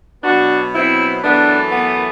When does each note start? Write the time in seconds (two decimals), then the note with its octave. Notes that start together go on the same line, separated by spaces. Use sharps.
0.23 B2 F#3 B3 D4 F#4
0.73 C4 E4
1.23 F#2 E3 A3 B3 D4
1.72 B3